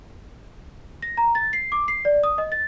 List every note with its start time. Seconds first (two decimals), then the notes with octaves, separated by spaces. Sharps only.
1.02 A#6
1.17 A#5
1.35 A6
1.53 C7
1.72 D6
1.88 C7
2.05 D5
2.23 D#6
2.38 D#5
2.52 A6